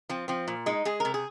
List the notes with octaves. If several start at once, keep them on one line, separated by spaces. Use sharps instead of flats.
F3 C4
F3 C4
A#2
G#3 D#4
G#3 G#4
C3 A#4
G#4